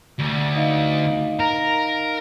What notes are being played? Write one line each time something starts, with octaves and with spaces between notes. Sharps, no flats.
D2
D#4 D#5 F5
A#4 A#5